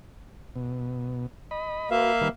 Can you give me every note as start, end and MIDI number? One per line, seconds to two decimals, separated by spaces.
0.56 1.26 47
1.51 1.90 75
1.51 1.90 83
1.91 2.28 58
1.91 2.12 66
1.91 2.12 71
1.91 2.28 76
1.91 2.28 77
2.21 2.29 51
2.21 2.29 55
2.21 2.29 71